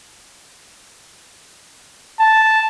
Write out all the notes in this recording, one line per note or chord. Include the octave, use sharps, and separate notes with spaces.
A5